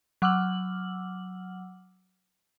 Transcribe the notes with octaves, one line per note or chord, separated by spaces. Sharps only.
F#3 F#5 D6 E6 F6 F#7